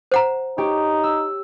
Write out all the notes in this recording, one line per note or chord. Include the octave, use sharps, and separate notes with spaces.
C5 F#5 A#5
D#4 G4 C#5
E6